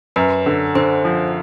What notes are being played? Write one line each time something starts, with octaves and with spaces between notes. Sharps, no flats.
F#2 B4
D3
D3 C5
F3